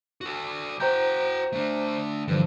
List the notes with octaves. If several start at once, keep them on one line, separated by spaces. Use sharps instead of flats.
F#4 A4
F#4 C5 G5 A#5 G6
A3 D4
G2 D3 E3 F3